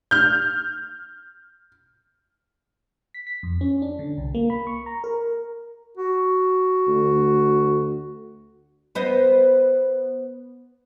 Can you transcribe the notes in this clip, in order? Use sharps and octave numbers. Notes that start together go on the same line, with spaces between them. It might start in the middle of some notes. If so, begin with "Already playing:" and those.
F6 G6
B6
B6
F2
C#4
D4
D3
C2
A#3
B5
C#6
A#5
A#4
F#4
D2
B3 C5 D#5